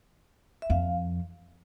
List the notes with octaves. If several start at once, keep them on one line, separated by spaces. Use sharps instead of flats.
E5
F2 F5